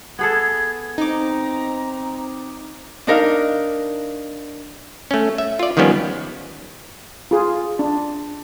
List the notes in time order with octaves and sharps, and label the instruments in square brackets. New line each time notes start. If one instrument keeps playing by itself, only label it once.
[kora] B3 G#4 A4 [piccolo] G#6
[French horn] C4 [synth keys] D#4 D6 [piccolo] A#5
[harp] D4 D#4 A#4 F5
[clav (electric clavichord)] A3 C#4
E5
F4 D5
D#3 F3 G3 B3 C#4
[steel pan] F4 G#4
D4